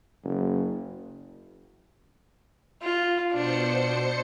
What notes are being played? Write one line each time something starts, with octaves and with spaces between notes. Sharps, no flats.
F#1
F4
B2 D4 C5 C#7